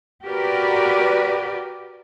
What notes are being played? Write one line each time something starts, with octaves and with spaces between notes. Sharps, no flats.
F#4 G4 A#4 B4 D5